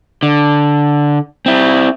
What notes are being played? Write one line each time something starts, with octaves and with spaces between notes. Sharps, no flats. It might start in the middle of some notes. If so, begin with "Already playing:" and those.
D3
C4 E4